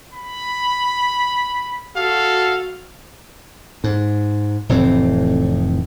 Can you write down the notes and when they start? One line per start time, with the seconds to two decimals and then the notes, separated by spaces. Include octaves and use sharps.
0.14 B5
1.96 F#4 A4 F5
3.84 G#2
4.69 F1 A2 E3 C4